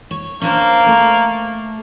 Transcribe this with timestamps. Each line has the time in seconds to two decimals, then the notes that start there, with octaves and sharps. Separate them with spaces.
0.11 C#5
0.42 A#3 C#4 D4 C5
0.86 A3 A4